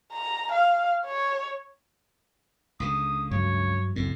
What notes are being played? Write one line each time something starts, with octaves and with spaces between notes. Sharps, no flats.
A#5
F5
C#5
C#2 D3 D#6
G2 F#3 C#5
C#2 F#2 A2 C4